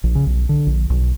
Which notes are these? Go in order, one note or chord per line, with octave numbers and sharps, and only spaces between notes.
A#1
C#3
B1
D3
A#1
B1